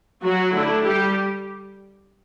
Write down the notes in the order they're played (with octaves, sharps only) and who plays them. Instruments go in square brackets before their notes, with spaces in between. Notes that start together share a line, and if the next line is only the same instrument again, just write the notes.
[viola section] F#3 F#4
D3 A3 D4 E4
G3 G4